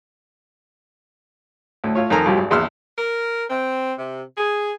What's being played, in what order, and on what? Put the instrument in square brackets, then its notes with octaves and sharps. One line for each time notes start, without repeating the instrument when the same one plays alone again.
[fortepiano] D2 A2
A2 F4 C#5
F2 D#3 A4 A#4 G#5 A#5
C2 G2 B2 F#3 F4 G4
G#1
A#1 E2 C6 E6 F6
[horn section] A#4
C4
C3
G#4